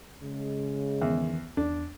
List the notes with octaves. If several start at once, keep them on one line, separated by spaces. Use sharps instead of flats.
C#3 G#3
E2 D#3 E3
E2 D4